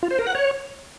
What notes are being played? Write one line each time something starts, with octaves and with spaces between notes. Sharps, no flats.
F4
C5
A#4
F#5
C#5